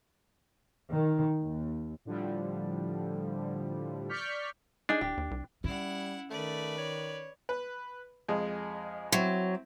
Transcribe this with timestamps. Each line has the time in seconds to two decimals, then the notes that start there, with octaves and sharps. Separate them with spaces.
0.91 D#3
1.42 D#2
2.05 A2 D3 F3 G3
4.09 D5 C#6 F6 G6 B6 C#7
4.89 D4 D#4 G#4 G#5
5.01 D#1 G4
5.17 D#2
5.31 C2
5.64 G3 C#4 E4 F#5
6.30 D#3 A3 B4 D5
6.78 C#5
7.49 B4
8.28 F2 G#3 G#4
9.12 F#3 C4 E4